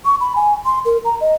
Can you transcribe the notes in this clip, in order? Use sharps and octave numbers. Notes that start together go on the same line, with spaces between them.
C#6
B5
G#5
C6
A#4
A#5
D#5